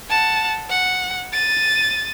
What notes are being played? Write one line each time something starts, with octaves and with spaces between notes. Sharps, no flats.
F#5 A5
F#5
A6 D#7